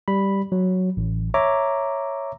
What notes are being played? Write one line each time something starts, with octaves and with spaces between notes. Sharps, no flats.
G3 B5
F#3
A1
C#5 E5 A#5 D6